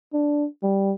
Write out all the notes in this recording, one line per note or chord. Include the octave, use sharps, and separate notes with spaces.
D4
G3